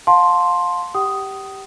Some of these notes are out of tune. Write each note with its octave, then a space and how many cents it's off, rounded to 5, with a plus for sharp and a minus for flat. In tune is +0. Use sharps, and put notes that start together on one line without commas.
F5 +30 A5 +0 C6 +5
G4 +0 G5 -40 D#6 +0